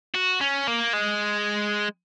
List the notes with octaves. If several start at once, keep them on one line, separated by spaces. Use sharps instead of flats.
F#4
C#4
A#3
G#3